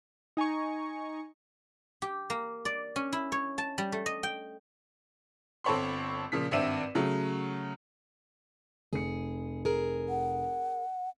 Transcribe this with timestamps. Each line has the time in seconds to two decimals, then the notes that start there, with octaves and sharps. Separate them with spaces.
0.37 D#4 G#5 A#5 C#6
2.02 G4
2.30 A#3
2.65 D5
2.96 C#4
3.13 E4
3.32 C#5
3.58 A5
3.78 G3
3.92 A3
4.06 D#5
4.23 G5
5.64 G1 C4 A4 C#5 B5 C6
6.32 A#2 C#3 F3 B6
6.51 G#1 G2 C4 E5 D#7 E7
6.95 C#3 F#3 A3
8.93 F1 G#4 C#7
9.65 G#4 A#4
10.09 F#5